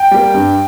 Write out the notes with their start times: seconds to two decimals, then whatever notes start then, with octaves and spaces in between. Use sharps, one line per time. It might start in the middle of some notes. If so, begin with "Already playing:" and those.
Already playing: G5
0.11 G3 A#3
0.34 G2